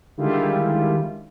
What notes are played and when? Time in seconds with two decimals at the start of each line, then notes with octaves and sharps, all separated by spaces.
0.17 D3 D#3 G3 G#3 E4 F4